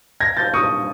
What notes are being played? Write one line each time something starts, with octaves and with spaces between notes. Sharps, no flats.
G#6 A#6
G6 A6
C#6 D#6